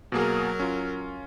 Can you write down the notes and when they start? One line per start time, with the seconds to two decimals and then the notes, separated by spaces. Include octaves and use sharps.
0.12 B2 F#3 A#3 G#4 A#4
0.60 C#4 F4